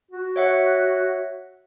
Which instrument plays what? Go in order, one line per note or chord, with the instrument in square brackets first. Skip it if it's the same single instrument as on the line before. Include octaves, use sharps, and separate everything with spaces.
[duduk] F#4
[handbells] C#5 E5 F#5